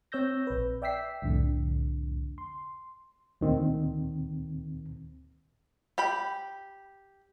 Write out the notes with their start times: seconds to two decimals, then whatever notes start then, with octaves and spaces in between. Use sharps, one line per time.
0.12 C4 C#5 E6 G6 A#6
0.47 A#1 B4
0.82 D5 E5 G5 E6 B6 C7
1.22 C2 F2 A2 D3
2.38 C6
3.41 D2 A#2 D#3 C4
5.98 G4 G5 B5